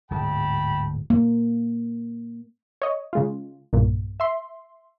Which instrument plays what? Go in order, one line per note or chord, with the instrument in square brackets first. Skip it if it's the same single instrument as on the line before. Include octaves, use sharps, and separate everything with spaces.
[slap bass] D1 G#2 [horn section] G5 A5 B5
[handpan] A#3
[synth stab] C#5 D#5
C#3 G#3 F4
B1 G2 A#2
E5 C6